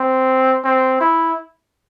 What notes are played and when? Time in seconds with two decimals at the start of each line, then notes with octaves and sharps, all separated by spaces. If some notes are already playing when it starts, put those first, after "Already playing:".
Already playing: C4
0.64 C4
1.01 E4